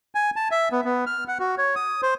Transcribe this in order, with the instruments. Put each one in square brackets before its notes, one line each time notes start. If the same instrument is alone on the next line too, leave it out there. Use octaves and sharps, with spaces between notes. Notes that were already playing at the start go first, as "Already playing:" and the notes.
[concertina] G#5
A5
E5
B3
B3
F6
F#5
F#4
C#5
D#6
C5